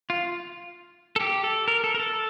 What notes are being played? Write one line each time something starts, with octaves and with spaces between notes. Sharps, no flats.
F4
A4
G4
A4
A#4
A4
A#4
A4